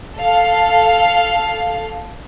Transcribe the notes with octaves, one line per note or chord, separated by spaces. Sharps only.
A4 F5